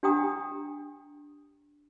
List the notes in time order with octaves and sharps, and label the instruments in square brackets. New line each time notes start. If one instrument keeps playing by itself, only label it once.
[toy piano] D4 G4 F#5 G5 A#5 D#6